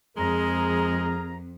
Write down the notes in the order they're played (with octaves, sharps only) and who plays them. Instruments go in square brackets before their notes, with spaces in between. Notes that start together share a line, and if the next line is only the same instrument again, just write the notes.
[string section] F2 [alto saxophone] G#3 [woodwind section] G#4 A#4 A#5